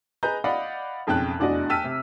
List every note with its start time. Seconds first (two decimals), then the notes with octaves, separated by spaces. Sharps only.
0.23 G#4 B4 D#5 A#5 G6
0.44 D5 D#5 F5 F#5 B5
1.07 B1 F2 C#3 G5 A5 F#6
1.39 F1 E2 D4 F#4 D5 D#5
1.69 G5 A5 E6 F6 B6 D#7
1.84 C3